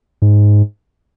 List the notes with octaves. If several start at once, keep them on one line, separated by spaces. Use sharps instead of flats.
G#2